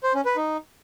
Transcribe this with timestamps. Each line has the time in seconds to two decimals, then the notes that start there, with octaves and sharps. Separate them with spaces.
0.03 C5
0.14 C#4
0.25 B4
0.36 D#4